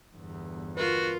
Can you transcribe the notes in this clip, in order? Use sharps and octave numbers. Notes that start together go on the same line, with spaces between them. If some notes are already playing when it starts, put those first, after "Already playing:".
G1 E2
F4 F#4 A#4 B4